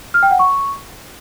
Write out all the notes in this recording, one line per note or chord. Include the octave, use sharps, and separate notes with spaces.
F6
G5
F#5
C#6